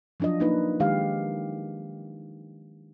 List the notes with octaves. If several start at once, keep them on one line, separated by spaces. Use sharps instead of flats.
F3 F#3 D4 F4 D#5
A#3 D4 D#4 B4
D#3 G#3 G4 F5